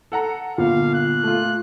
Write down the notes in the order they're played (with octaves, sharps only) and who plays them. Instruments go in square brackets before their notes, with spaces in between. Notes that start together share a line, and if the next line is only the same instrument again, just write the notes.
[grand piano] A4 F#5 A#5
[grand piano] G1 [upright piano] A#2 [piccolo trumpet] F5
[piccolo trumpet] F#6
[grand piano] A3 F4